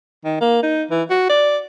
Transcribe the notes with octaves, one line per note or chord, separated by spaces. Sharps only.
D#3
A#3
D#4
E3
F#4
D5